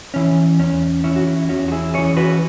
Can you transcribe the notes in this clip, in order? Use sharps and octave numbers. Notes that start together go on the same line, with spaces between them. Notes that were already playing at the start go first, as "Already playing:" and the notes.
E3 C#4
E2 C#4
E3 C#4 E4
F#4
E4
E2 C#4 F#4
F#4
E4 G#4
E3 C#4 G#4 C#5
F#4 B4